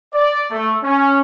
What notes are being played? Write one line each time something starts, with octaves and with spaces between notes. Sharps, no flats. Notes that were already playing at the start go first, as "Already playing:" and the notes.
D5
A3
C#4